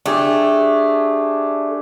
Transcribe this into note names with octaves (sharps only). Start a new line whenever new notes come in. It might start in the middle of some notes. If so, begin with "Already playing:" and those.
A3 D4 G4 G#4